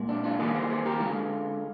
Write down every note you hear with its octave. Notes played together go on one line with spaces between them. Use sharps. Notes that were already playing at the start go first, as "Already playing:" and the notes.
Already playing: A#2 G#3
D4
D4 F4
D#3 G3 A#3 F4 G#4
G#4 C5
G#4 C5
G4 A#4
D3 G#3 F4 G#4